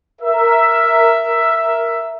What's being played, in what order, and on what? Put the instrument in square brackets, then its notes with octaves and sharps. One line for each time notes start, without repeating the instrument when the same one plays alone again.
[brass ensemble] A#4 E5